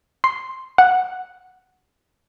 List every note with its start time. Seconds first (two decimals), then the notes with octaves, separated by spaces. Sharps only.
0.24 C6
0.78 F#5